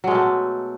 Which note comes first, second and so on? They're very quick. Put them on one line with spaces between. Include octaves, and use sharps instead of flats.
F#3 G#3 B2 A3